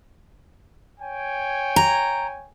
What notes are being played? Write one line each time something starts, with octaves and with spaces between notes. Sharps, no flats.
C#5 G5 G#5
A#5